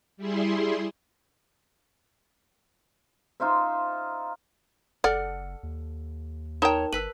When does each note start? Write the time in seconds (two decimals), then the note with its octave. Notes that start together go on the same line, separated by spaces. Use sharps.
0.17 G3 E4 G#4 C6
3.40 D#4 F4 C5 E5
5.04 F#1 A4 D5 F#5 F6
5.63 D#2
6.62 D#4 A#4 C#5 G5 A5
6.93 G1 B4 E6 B6 F#7